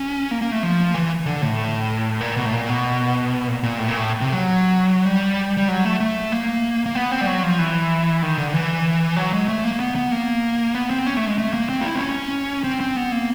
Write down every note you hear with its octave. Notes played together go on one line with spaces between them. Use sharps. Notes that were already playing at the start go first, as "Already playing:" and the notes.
Already playing: C#4
A#3
A#3
A3
F3
E3
D3
A2
A#2
B2
A2
A#2
B2
A#2
A#2
A2
A#2
A2
C3
F#3
G3
G3
F#3
A3
A3
A#3
A#3
B3
C4
G3
F#3
F3
E3
D#3
D3
E3
F#3
G#3
A3
A#3
B3
B3
A#3
B3
C4
C#4
A3
G#3
A3
A#3
C4
F4
E4
C4
C#4
C4
C4
B3
A#3